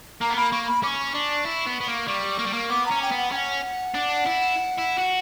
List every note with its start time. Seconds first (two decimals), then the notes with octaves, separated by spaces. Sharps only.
0.21 A#3 A#5
0.30 B3
0.36 A#3 B5
0.52 A#3 C#6
0.67 B5
0.83 C#4 C#6 D6
1.15 D4
1.45 E4
1.67 B3
1.81 B3
1.88 A#3
2.08 G3 C#6
2.39 A#3
2.46 G3
2.53 A#3
2.70 B3 D6
2.86 C#4 A#5
3.02 G5
3.12 B3
3.17 F#5
3.32 C#4 G5
3.36 F#5
3.94 D4
4.26 E4
4.78 E4
4.98 F#4